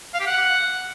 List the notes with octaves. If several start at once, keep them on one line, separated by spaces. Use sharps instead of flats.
F5
G4
F#5